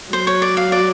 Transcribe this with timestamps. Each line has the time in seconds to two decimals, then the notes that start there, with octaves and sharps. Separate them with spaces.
0.12 F#3 C5
0.27 C#5
0.42 D5
0.57 F5
0.72 D5